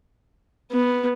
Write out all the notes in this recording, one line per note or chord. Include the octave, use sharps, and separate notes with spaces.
B3